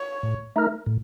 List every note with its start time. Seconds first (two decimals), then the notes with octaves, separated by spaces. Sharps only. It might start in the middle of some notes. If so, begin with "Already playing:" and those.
Already playing: C#5
0.23 A2
0.56 A3 D#4 A#4
0.86 A2